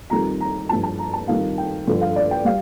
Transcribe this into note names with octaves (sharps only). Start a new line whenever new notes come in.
F2 D#3 G3 A#5
A#5
G2 F3 A5
A5
A#5
A5
F2 D#3 G3 F5
G5
G2 D3 F3
F5
D5
G5
G3 F5